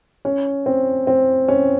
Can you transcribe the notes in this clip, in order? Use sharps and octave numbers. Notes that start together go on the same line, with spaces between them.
C#4
C4
C4
C#4